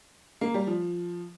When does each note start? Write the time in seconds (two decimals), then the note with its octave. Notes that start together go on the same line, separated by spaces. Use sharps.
0.41 A#3
0.54 G3
0.67 F3